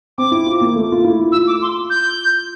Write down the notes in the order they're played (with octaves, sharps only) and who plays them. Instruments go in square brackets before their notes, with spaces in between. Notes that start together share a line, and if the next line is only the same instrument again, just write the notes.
[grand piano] C4 [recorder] D6
[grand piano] E4
F4
A#3
A3
F4
E4
[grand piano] F4 [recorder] E6
[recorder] D6
C6
G6